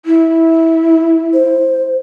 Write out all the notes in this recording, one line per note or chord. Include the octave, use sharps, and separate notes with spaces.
E4
C5